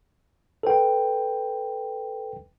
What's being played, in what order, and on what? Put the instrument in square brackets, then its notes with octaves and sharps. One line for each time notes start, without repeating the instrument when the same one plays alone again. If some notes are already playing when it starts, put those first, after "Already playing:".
[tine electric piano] A4 B4 G5